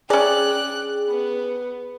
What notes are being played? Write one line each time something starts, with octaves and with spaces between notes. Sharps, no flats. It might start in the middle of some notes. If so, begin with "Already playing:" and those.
C#4 G#4 D5 G5 F#6
B3